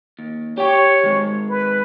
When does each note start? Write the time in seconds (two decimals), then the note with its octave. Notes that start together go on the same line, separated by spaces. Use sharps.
0.19 D#2
0.58 G4 C#5 G5
1.04 D#3 G#3
1.49 B4